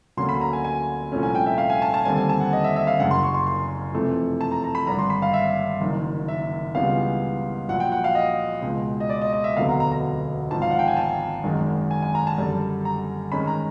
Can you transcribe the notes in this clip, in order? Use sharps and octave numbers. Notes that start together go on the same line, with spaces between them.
D2 D3 F#3 A#3 C#4 C6
B5
A#5
G#5
G#5
C2 A#2 F3 A3 C#4
G#5
G5
E5
F5
G#5
A5
A5
D#2 D3 G3 C4 G#5
G#5
A5
F#5
D#5
E5
E5
F5
F#1 F#2 C#3 F#5
C6
C#6
C6
C6
F2 C3 E3 A3
A5
A#5
A#5
B5
G#1 G2 D3 A#5
C6
B5
F5
E5
F#1 F#2 D#3
E5
C#2 C#3 E3 G3 B3 F5
A#1 A#2 F#3 F#5
G5
F#5
F5
D#5
C#2 B2 G#3
D#5
D5
D#5
D#5
E5
E1 D2 D3 F#3 B3 F5
A#5
A#5
A#5
G#1 G#2 F3 A5
F5
F#5
G5
G#5
A5
G#1 F#2 D#3 G#3
G#5
G#5
A#5
A5
F#2 D3 G3
A#5
G#2 D#3 G#3 C#4 B5
A#5